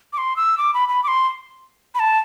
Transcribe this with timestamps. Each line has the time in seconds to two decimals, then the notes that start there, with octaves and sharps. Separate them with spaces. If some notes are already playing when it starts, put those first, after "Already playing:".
0.13 D6
0.18 C6
0.36 E6
0.58 D6
0.74 B5
0.89 B5
1.04 D6
1.08 C6
1.95 B5
1.99 A5